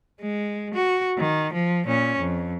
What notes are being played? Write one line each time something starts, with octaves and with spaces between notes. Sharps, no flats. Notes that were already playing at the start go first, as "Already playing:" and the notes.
G#3
F#4
D#3
F3
A#2 C#4
F2